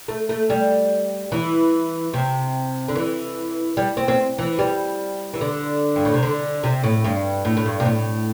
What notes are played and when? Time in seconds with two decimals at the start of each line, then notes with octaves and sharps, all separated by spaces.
0.08 A3
0.29 A3
0.50 G3
1.32 E3
2.13 C3
2.88 D3
2.95 E3
3.77 G3
3.97 C4
4.08 C4
4.38 E3
4.59 G3
5.34 E3
5.41 D3
5.96 G2
6.05 A2
6.14 C3
6.23 D3
6.63 C3
6.83 A2
7.04 G2
7.45 A2
7.57 A2
7.66 G2
7.80 C3
7.85 A2